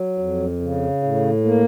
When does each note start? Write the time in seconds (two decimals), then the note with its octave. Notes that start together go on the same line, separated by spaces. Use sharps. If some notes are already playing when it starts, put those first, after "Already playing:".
Already playing: F#3
0.19 F2
0.61 C#3
1.03 A2
1.45 A#3